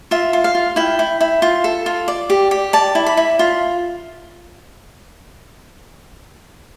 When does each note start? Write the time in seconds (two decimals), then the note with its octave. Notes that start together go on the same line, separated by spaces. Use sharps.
0.11 F4 E5
0.33 F4
0.44 F5
0.55 F4
0.76 E4 G5
0.99 E4
1.21 E4
1.42 F4
1.64 A4
1.86 F4
2.08 D5
2.30 G4
2.51 G4
2.73 D5 A5
2.95 E4
3.06 B5
3.17 E4
3.39 F4